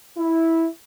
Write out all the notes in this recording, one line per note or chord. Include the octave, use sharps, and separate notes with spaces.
E4